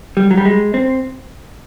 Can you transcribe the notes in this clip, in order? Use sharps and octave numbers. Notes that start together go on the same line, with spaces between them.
G3
F#3
G3
G#3
C4